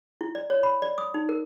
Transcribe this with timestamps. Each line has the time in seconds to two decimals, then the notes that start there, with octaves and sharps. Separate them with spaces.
0.21 E4
0.35 D5
0.50 C#5
0.63 B5
0.82 D5
0.98 D#6
1.14 D#4
1.29 A#4